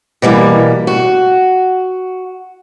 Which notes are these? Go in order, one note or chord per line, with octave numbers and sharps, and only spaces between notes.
B2 E3 G3 A#3
F#4